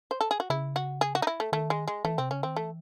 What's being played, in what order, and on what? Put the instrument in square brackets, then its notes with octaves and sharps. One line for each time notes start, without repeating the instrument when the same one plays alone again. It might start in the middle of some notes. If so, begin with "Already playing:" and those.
[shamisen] C5
A4
G#4
F#4
[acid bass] C#3 [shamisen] E4
[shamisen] F#4
G#4
F#4
D#4
E4
A3
[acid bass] D#3 [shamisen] A3
[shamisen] G#3
G#3
[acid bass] E3 [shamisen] A3
[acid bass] C3 [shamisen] C4
[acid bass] C#3 [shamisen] C#4
[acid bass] D#3 [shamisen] C4
[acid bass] E3 [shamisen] A3